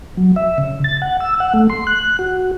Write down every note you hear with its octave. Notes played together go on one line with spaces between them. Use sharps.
F#3
E5
C#3
A6
F#5
E6
F#5
A3
C6
F#6
F#4